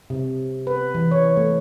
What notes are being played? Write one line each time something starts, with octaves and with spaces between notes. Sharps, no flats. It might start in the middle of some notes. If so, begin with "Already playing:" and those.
C3
B4
E3
C#5
A3